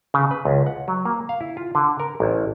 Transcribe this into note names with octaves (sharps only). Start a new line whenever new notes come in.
C#3
B4
C#2
F#5
F#3
A#3
F5
E4
F4
D3
A#4
A1